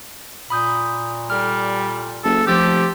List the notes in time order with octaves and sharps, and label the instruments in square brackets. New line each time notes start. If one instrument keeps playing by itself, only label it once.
[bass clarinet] A#2 [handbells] B5 D#6 G6
[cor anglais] G3 [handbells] A4 F6
[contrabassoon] F#1 [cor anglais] A4
[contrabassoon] F1 [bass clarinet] F3 [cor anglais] G4 [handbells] D6 E6 A6